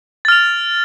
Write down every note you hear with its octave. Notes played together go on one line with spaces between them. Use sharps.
F6 A6 F7